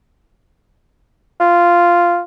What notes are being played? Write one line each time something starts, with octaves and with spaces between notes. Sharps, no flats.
F4